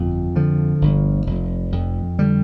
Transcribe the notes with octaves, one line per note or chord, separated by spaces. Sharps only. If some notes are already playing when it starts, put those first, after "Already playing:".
Already playing: G1 F2
D3 F3
G1
F1
F2
D3 G3